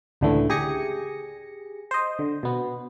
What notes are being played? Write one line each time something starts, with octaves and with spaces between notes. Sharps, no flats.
C#2 A2 D3 E3 A3
G4 G#4 G#5 A#6 C#7
C5 D#5
D3
B2 B3